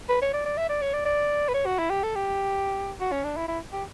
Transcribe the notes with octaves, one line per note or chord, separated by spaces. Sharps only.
B4
C#5
D5
D5
E5
D5
C#5
D5
D5
B4
C#5
F#4
E4
G4
A4
G4
F#4
C#4
D4
E4
E4
G4